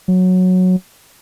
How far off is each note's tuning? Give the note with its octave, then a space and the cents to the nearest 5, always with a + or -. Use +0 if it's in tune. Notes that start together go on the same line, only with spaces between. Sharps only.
F#3 -10